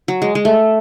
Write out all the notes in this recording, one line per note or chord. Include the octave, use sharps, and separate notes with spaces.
F#3
G#3
G#3
A3